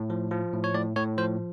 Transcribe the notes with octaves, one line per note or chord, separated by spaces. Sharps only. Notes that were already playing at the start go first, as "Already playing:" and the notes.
Already playing: A2
F3
F3
A2
C#5
A2 D5
A2 C#5
F3 C5